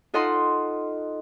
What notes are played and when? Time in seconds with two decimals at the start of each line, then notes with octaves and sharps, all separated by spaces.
0.14 D#4 F4 A4 D#5 F#5 C6